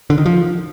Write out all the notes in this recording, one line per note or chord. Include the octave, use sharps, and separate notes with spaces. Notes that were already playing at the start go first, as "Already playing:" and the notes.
D3
D#3
F3